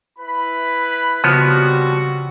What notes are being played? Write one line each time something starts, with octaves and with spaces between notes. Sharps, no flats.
E4 B4 B5
C#3 F3 G3 B3 C4 F#4